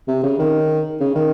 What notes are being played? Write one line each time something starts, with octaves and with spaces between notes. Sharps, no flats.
C3
C#3
D#3
C#3
D#3